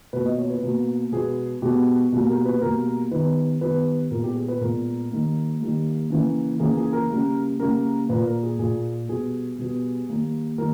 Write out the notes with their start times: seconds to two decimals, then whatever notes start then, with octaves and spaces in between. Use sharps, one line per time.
0.13 B2 A#3 B4
0.25 D#5
0.38 C#5
0.50 B4
0.63 B2 A#3
1.12 B2 G#3 B3 G#4
1.62 B2 G#3 B3 G4
2.12 B2 G3 A#3
2.29 A#4
2.45 B4
2.61 B2 G3 A#3 A#4
3.11 D#3 G3 B3 B4
3.61 D#3 G3 B3 B4
4.11 A#2 G#3 B3 A#4
4.24 G4
4.36 G#4
4.48 B4
4.61 A#2 G#3 B3 A#4
5.11 D#3 G3 A#3
5.61 D#3 G3 A#3
6.10 C#3 E3 A#3
6.60 C#3 E3 A#3 G#4
6.77 G#4
6.93 A#4
7.10 C#3 G3 A#3
7.60 C#3 G3 A#3 A#4
8.09 A#2 A#3 B4
8.26 A#4
8.43 G#4
8.59 A#2 A#3 G#4
9.09 B2 G3 B3 G#4
9.58 B2 G3 B3
10.09 D#3 G3 A#3
10.58 D#3 G3 A#3 A#4